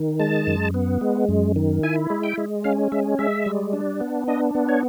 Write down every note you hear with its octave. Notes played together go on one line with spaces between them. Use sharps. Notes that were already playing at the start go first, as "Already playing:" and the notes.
Already playing: D#3
G#3 A5
F#2
B3
G#3
F#2
D#3
E4 G#5
G#3
G5
G#3
C#4 F5
G#3 E5
G#3 E5
G3
D4
B3
D4 D#5
B3
C#5